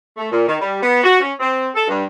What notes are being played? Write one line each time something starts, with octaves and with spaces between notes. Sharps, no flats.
A3
A#2
D#3
G3
B3
F#4
C#4
C4
A4
G2